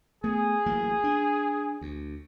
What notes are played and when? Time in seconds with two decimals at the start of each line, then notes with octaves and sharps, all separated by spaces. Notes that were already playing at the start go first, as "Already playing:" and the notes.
0.24 A3 B3 G#4
0.66 A1 F#3 A#3
1.04 D4
1.81 D2